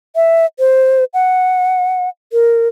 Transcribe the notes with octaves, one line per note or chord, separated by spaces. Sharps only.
E5
C5
F#5
A#4